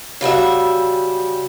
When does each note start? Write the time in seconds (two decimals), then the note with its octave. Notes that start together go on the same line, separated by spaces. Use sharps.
0.21 C#3 G3 F#4 E5